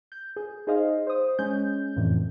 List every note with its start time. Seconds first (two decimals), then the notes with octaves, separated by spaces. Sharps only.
0.12 G6
0.36 G#4
0.67 D#4 G#4 C5 D#5 F5
1.07 C5 D#6
1.39 G#3 C#4 G6
1.96 F2 A2 D3 E3